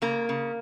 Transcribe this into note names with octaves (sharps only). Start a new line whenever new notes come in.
C#3 A#3
C#3